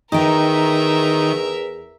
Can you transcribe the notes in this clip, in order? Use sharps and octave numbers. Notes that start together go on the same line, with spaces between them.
E2 D#3 D#4 A#4 E5 G5